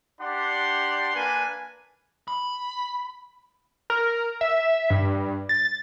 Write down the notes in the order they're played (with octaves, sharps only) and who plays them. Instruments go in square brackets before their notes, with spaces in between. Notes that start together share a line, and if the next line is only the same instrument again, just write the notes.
[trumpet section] D4 G4 D5 F#5 C6
A#3 D4 B4 G#5
[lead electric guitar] B5
[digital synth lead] A#4
E5
G2
A6